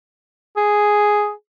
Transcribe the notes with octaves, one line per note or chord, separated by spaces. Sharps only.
G#4